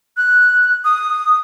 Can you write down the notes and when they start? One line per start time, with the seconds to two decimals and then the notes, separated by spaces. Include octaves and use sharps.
0.17 F#6
0.85 D#6